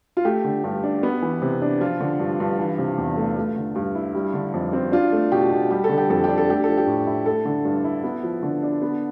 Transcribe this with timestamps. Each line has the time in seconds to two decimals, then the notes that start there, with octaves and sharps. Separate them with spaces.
0.17 F4
0.25 A3 G4
0.44 D3
0.64 G2
0.83 D4
1.03 B3
1.22 E3
1.42 C3
1.62 D4
1.81 F3 F4
2.00 D3
2.19 G2
2.40 G2
2.59 E3
2.78 C3
2.98 E2
3.17 A3
3.37 A3
3.56 D3
3.75 G2
3.95 E4
4.15 G3
4.34 D3
4.54 F2
4.73 C4
4.92 D4 F4
5.13 A3
5.32 B2 G4
5.51 B2
5.71 G3 G4
5.84 A4
5.89 D3
5.98 G4
6.10 F2 A4
6.24 D4 G4
6.38 A4
6.48 A3 G4
6.64 F3 A4
6.77 G4
6.87 A2
7.07 E4
7.26 A3 A4
7.45 D3
7.65 G2
7.84 E4
8.04 B3
8.23 F3
8.43 D3
8.63 D4
8.82 B3